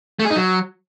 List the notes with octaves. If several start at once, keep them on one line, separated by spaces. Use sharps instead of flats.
A3
G#4
D#4
F#3